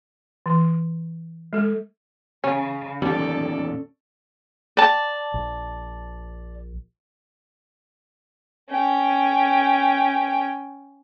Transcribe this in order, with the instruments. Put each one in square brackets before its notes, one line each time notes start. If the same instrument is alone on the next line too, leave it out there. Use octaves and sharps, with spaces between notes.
[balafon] E3
G#3 A4
[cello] C#3 [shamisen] C#4
[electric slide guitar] E2 A#2 D#3 [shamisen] G3 [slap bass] C#4 [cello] A4 D5
[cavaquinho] D5 A5
[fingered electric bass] A#1
[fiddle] C#4 G5